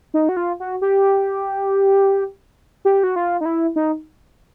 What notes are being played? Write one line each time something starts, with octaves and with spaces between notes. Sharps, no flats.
D#4
F#4
F4
F#4
G4
G4
F#4
F4
D#4
E4
D#4